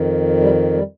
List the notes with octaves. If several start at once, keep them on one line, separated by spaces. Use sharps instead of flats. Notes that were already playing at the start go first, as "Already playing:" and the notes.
Already playing: F2 D#3
G3
G3